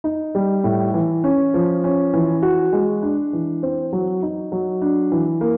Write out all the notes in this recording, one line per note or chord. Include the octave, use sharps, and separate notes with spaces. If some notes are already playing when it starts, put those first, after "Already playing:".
D#4
G3
A2
E3
C#4
F3
C#4
E3
F#4
G#3
D4
E3
C4
F#3
D#4
F#3
D4
E3
A#3